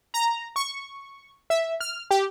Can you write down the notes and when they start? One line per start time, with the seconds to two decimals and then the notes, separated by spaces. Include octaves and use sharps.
0.14 A#5
0.56 C#6
1.50 E5
1.81 F6
2.11 G4